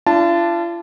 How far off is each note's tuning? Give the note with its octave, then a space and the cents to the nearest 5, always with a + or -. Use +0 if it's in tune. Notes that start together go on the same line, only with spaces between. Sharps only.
D4 +0 F4 -40 A5 +0